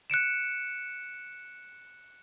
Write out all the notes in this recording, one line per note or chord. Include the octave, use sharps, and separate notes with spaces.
F#6 C#7 D7 E7